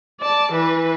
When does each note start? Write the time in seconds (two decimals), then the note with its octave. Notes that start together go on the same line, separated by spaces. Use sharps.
0.21 D5 A5
0.53 E3 B4